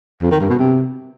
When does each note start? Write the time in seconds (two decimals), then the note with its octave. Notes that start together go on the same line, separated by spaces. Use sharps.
0.22 F2
0.31 D#3
0.40 G2
0.50 B2
0.59 C3